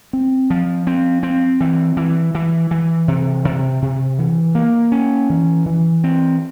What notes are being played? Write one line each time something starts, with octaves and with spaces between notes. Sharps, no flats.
C4
F3
C4
C4
E3
E3
E3
E3
C3
C3
C3
E3
A#3
C#4
E3
E3
C4